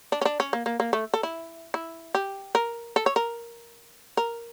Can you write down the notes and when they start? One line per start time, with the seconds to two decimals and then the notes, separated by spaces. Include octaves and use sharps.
0.12 D4
0.21 C#4
0.25 D4
0.40 C#4
0.53 A#3
0.66 A#3
0.80 A#3
0.93 A3
1.14 A4
1.23 E4
1.74 E4
2.15 G4
2.55 A#4
2.96 A4
3.06 C#5
3.16 A#4
4.17 A#4